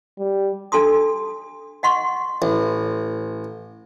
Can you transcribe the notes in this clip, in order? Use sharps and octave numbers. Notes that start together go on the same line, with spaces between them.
G3
D4 A4 A5 C6 D#6
D#5 F#5 C6 C#6
A1